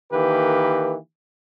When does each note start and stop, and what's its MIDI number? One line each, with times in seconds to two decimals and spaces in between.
0.12 0.95 51
0.12 0.95 52
0.12 0.95 58
0.12 0.95 67
0.12 0.95 71